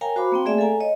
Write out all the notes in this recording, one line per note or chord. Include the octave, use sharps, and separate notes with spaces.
A#4 C#5 F5 G5 G#5 A#5
F#4 C5 F5 B5 D6
A#3 C4 G5
A3 G#4 D5 E5 G#5
A4 F5 G#5 A#5
C#5 D#5